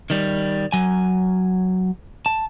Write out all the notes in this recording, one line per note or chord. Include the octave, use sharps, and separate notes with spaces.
D#3 G3
F#3 G#5
A5